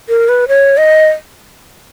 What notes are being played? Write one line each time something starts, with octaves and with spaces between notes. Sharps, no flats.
A#4
B4
C#5
D#5